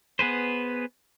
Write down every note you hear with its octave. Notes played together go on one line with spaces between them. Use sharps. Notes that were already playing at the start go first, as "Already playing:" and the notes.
B3 G#4 B4 C5